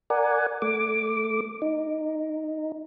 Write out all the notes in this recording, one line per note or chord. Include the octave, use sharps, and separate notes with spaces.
A#4 D5 F#5 G#5
A3 D6
D#4